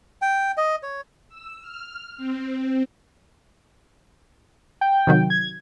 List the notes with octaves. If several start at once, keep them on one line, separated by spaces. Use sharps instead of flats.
G5
D#5
C#5
E6
F6
C4
G5
C3 D#3 F#3
G#6